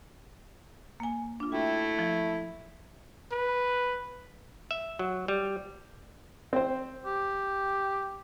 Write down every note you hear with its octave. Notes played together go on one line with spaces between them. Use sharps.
A#3 G#5
D4 F4
A3 E4 F#4 G5
F3
B4
E5
F#3
G3
C4 C5
G4